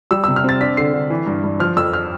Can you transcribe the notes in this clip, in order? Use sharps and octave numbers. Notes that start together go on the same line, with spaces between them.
G3 E6
E6
C3
F6
C4 A6
D4 B6
D3 C7
D3
E3
G2
G2
F3 F6
F2 E6
F6